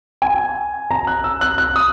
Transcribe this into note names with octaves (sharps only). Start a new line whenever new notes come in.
G#5
A#5
F#6
E6
F#6
F#6
D#6